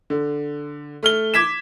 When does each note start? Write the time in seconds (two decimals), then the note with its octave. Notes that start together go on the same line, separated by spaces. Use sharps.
0.10 D3
1.03 A3 F6 G7
1.34 D6 G#6 B6 E7